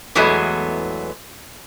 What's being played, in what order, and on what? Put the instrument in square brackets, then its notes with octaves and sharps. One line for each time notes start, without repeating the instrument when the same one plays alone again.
[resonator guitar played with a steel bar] E2 E3 F#3 G#3 A3 B3